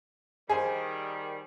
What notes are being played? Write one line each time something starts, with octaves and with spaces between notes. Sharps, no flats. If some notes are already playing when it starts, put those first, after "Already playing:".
D#3 G3 G#4 C5